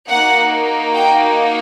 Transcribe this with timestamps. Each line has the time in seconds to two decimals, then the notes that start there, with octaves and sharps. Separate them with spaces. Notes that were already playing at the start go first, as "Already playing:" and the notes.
0.10 A#3 D#4 F#4 F#5
0.94 G5